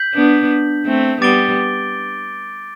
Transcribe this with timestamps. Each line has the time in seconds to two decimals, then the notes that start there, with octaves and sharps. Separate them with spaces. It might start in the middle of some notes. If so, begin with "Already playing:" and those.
Already playing: G6 B6 F#7
0.14 B3 D4
0.86 A3 C4
1.21 G3 B3 D6 A6 D7 G7